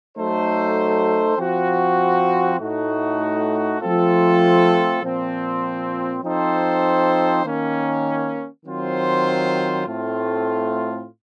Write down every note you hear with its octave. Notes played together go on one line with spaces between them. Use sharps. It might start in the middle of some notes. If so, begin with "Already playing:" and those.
F#3 A3 D#4 A4 C5
F3 C4 F#4
A2 A3 D#4 F#4
F3 A3 C4 F4 A4
A#2 F3 C4
F3 C4 D#4 A4 C5
D#3 A#3 C#4
D#3 F#3 C4 F4 C5
A2 A3 C4 F4